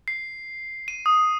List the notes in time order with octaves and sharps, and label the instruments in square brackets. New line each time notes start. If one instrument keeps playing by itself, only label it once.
[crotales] C7
D#7
D#6